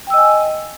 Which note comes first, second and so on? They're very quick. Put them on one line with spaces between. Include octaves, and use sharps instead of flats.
G5 E6 D#5 G#5